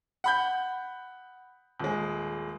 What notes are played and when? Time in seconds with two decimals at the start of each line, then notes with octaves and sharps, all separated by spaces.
0.24 F#5 B5 G6
1.80 D#1 G#3